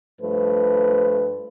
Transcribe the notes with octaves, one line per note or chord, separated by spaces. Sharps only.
G2 F3 A3 B4 C5